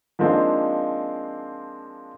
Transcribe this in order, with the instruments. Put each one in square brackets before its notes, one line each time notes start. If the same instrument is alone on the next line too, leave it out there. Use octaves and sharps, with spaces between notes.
[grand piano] F3 G#3 A#3 C4 D4 D#4